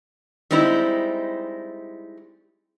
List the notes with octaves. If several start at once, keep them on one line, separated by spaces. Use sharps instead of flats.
G3 G#3 C4 D#4 E4